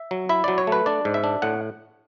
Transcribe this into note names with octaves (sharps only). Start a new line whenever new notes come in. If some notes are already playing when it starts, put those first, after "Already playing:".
Already playing: E5
F#3
E4 E5
F#3 D5
C#5
A3 B4
D4 D5
G#2
E5
D4
A2 F#5